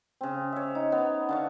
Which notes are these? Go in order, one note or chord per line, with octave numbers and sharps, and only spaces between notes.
C#3 C4
C#5 E5
D#4
B3
D3 F5 C#6